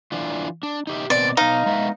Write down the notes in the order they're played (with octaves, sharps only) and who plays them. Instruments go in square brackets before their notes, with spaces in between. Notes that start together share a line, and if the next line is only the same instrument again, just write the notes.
[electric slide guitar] E3 D4 F4
D4
D#4 G4 E5
[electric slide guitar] B2 A#3 C4 [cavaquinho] D5
[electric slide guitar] B2 A#5 [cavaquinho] D#4 F5
[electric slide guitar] G#3 B3 E5